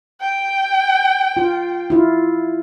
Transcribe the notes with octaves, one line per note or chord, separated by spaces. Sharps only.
G5
F4
E4 F4